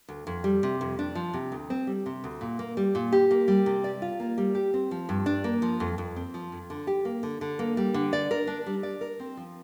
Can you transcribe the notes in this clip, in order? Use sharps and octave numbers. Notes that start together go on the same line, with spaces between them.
D2
F2
G3
C3
F2
D4
F3
C3
D2
C4
G3
C3
D2
A#2
A#3
G3
A#2
G4
A#3
G3
C3
D5
F4
A#3
G3
G4
C4
F3
G2
D4
A#3
F3
F2
F2
C4
F3
F2
D3
G4
A#3
D3
D3
A#3
G3
D3
D5
A#4
D4
G3
D5
A#4
C4
F3